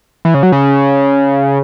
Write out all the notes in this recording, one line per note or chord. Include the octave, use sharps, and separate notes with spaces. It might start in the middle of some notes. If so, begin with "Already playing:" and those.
E3
C#3
F#3
C#3